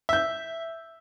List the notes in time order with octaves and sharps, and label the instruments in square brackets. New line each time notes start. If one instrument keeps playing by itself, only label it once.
[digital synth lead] E5 [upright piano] E6 G6